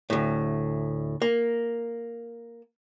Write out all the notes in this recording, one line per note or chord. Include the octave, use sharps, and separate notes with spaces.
D2 A2
A#3